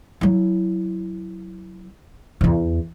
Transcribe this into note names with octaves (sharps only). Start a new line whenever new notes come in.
F#3 E4
D1 E2